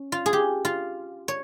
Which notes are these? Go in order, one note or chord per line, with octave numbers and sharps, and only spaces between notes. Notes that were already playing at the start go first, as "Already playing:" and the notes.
Already playing: C#4
F4
G#4
G4
F4
C#5